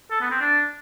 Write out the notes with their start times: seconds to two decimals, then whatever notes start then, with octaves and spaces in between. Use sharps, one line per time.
0.11 A4
0.21 B3
0.31 C4
0.41 D4